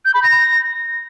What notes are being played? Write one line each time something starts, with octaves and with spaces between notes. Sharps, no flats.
G6
B5
A#6